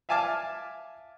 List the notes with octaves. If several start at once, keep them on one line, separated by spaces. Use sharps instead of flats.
E5 F5 G#5 A5 D6 F6